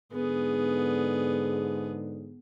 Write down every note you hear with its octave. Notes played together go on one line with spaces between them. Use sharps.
G#2 D3 B3 G#4